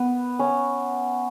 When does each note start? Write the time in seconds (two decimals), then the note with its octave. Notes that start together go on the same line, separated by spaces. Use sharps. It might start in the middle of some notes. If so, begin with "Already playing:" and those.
Already playing: B3
0.39 C#4